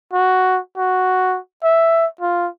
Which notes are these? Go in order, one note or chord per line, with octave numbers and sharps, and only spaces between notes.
F#4
F#4
E5
F4